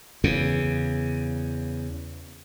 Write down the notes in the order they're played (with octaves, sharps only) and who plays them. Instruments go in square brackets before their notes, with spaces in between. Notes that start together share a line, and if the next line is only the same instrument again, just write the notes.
[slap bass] E2 C#3